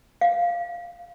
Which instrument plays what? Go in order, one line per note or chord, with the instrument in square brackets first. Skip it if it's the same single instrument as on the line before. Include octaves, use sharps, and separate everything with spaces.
[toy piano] F5